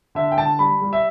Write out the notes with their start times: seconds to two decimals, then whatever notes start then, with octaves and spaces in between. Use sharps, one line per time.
0.15 D3 E5
0.31 G5
0.37 D3 A5
0.59 G3 B5
0.82 G3
0.93 E5